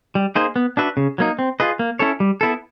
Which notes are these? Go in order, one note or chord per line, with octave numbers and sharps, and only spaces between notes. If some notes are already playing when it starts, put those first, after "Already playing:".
G3
A#3 D#4 G#4 C5
B3
D4 F#4 B4 E5
C#3
F#3 A#3 D#4
C4
F4 G#4 B4 D#5
A#3
C#4 E4 A4 C#5
G3
B3 E4 A4